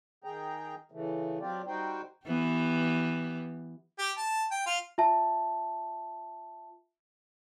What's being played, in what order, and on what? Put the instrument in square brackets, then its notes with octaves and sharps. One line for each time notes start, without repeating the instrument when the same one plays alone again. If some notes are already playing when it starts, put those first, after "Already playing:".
[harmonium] D#3 G#4 G5 A#5
C#3 E3 A3
F#3 C4 F4 G4 D5
G3 D#4 F#4 C5 G5
[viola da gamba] E3 B3 G4
[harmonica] G4
A5
G5
F4
[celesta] F4 E5 A5